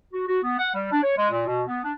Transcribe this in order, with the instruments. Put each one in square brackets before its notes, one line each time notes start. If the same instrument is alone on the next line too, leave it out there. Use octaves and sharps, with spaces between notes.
[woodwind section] F#4
F#4
B3
F#5
G3
D4
C#5
G#3
A#2
B2
B3
D4